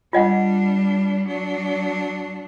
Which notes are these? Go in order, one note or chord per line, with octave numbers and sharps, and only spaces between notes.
G3 D4 F4 D#5 F#5
F#3 D4